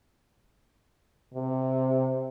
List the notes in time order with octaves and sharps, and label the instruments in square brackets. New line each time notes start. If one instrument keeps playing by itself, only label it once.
[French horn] C3